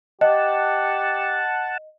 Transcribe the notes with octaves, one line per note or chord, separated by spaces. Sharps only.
G4 D#5 F#5 A5